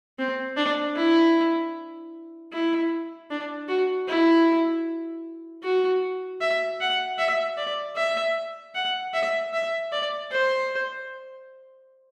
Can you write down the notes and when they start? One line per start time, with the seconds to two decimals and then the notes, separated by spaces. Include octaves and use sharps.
0.19 C4
0.57 D4
0.96 E4
2.52 E4
3.30 D4
3.68 F#4
4.08 E4
5.63 F#4
6.41 E5
6.81 F#5
7.18 E5
7.57 D5
7.96 E5
8.75 F#5
9.14 E5
9.53 E5
9.92 D5
10.31 C5